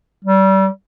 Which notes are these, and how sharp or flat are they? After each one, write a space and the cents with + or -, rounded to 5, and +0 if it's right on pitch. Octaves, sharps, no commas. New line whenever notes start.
G3 -30